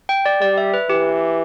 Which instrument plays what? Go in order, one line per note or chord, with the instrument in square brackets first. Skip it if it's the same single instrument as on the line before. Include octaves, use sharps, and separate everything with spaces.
[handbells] G5
D5
[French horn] G3 [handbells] D5
[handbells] E5
B4
[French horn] E3 [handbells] G4